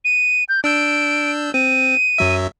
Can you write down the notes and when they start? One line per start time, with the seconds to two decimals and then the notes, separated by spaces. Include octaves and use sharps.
0.05 D#7
0.49 G6
0.64 D4 E6 G6 D7
1.54 C4 D#7
2.18 F#2 F#3 E5